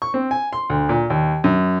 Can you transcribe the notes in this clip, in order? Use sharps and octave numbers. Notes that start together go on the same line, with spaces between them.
C#6
C4
G#5
C6
D2
A#2
D#2
F#2